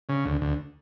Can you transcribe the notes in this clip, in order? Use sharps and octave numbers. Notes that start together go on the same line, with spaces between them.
C#3
D2
D2